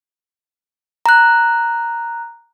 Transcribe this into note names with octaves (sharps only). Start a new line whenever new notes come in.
A#5 F#6